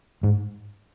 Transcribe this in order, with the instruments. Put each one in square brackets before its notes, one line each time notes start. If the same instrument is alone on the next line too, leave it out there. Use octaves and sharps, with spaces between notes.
[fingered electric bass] G#2